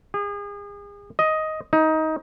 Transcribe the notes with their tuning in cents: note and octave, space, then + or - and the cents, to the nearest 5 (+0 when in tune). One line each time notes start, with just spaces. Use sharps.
G#4 -35
D#5 +10
D#4 +20